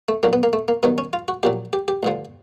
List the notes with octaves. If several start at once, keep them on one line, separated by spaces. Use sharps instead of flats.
A3
B1 A#2 F#3 A#3
B3
A#3
A3
A#3
G2 D#3 F#3 B3
C#4
F4
F#4
A#1 A#2 F#3 G4
G4
G4
A1 G2 D3 F3